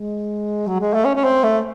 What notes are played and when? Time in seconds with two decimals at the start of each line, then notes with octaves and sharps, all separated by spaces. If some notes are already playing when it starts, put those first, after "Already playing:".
Already playing: G#3
0.67 F#3
0.80 G#3
0.94 A3
1.05 C#4
1.15 C#4
1.24 C4
1.44 A3